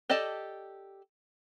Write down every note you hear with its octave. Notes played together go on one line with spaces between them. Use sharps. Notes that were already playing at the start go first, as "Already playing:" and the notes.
G4 A4 D5 D#5 A5